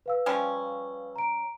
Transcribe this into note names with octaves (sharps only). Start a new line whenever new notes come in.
B4 F5 E6
F3 G3 C#4
A#5 D7